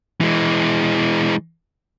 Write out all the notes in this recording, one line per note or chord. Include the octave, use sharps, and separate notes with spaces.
E3 G#3